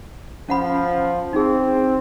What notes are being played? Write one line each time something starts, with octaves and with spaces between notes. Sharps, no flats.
F3 C#4 F#5 B5
C4 D#4 G#4